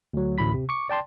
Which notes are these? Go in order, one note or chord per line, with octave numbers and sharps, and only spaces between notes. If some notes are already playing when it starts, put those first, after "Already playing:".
D2 F#3
A1 D2 A2 B5 B6
C3
C#6 D6 C#7
D5 G5 A5 C6